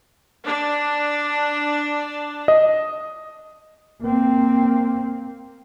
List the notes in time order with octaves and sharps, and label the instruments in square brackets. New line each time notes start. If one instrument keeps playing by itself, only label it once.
[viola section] D4
[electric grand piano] D#5
[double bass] A#3 C4